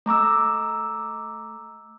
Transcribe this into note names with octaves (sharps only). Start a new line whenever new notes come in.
A3 A#5 D6 E6